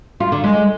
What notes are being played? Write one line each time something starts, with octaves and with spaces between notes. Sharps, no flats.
F4
D3
G#3